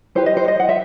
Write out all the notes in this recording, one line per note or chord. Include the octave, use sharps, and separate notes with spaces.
E4 G4 B4 C5
D#5
C5
D#5
F#5
E5